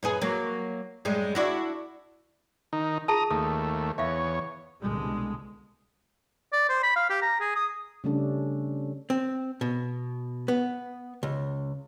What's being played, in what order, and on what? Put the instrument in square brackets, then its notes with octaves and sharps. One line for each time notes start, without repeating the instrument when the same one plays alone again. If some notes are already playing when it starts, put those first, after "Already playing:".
[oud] F#2 B3 G#4
F#3 A#3
F#2 G3 G#3
D4 E4 F#4
[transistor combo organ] D#3 D#4
[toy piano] F4 G#4 A5 [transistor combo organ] A#5 D#6
[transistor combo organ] D#2 A3 [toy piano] D#6
[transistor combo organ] E2 C#5 [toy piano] E5 F5
[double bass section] C2 B2 D3 G#3
[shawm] D5
C5
B5
F5
G4
A#5
G#4
D#6
[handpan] C#3 G3 A3 C#4 D4 A4
[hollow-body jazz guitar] C4
B2
B3
C#2